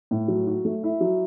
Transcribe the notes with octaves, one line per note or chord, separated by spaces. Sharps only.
A2
F#3
F#4
A3
E4
F#3